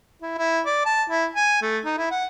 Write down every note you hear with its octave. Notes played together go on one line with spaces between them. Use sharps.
E4
E4
D5
A5
E4
G#5
A3
D#4
E4
F#5